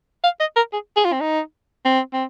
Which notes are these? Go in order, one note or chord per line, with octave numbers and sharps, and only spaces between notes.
F5
D#5
A#4
G#4
G#4
F4
C4
D#4
C4
C4